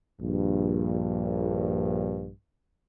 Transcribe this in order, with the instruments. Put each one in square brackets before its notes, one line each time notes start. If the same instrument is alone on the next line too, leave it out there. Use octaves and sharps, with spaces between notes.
[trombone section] A#1 G2